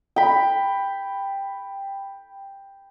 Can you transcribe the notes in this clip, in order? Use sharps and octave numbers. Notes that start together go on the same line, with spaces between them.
G5 B5